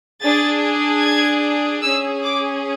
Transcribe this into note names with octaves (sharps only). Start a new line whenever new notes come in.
D4 G#4 A6
G#6
C#4 G#4 E6
D6